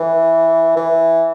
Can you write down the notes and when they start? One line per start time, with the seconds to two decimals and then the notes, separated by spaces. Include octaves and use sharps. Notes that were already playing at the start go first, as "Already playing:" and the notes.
Already playing: E3
0.76 E3